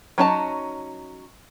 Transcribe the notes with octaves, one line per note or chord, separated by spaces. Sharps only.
F#3 C#4 D#4 A4 A5